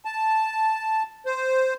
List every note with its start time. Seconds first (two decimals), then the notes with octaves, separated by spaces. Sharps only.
0.05 A5
1.26 C5